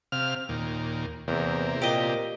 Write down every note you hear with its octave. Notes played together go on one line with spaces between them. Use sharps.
C3 F5 F6
D#2 A#2
E2 C3 A#3
A#2 G4 D#5